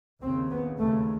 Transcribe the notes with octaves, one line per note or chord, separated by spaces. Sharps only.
D#2 C#3 C4
B3
D#2 C#3 A3